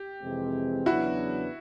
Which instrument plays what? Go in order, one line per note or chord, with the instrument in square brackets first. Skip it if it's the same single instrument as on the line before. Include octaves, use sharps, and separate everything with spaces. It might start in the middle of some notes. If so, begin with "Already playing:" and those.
Already playing: [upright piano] G4
[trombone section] F2 C3 E3 G#3 C4
[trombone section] E2 C#3 F#3 B3 D4 [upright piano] E4 F#4